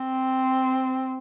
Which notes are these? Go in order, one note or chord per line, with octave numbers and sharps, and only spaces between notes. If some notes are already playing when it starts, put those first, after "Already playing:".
Already playing: C4